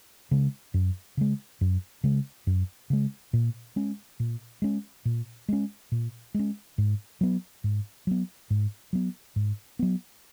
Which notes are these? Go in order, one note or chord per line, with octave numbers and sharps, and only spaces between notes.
C#3 G#3
F#2
C#3 G#3
F#2
C#3 G#3
F#2
C#3 G#3
A#2
G#3 C#4
A#2
G#3 C#4
A#2
G#3 C#4
A#2
G#3 C#4
G#2
F#3 B3
G#2
F#3 B3
G#2
F#3 B3
G#2
F#3 B3